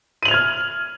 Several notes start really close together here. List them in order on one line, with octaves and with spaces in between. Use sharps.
D#7 F#7 F7 G#6 F6